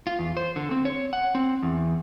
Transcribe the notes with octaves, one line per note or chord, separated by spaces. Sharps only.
F4
E2
C5
D3
C4
C#5
F#5
C4
E2